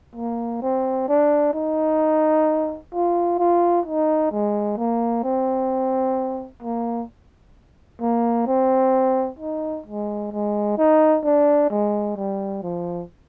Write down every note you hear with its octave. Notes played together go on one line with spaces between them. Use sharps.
A#3
C4
D4
D#4
F4
F4
D#4
G#3
A#3
C4
A#3
A#3
C4
D#4
G#3
G#3
D#4
D4
G#3
G3
F3